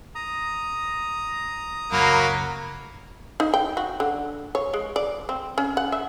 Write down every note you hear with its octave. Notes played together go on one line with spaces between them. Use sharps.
A#5 D#6
C#2 F#2 F#3 A#3 B5
D#4
G5
F#4
D3
C#5
G#3
D5
C4
C#4
F#5
E5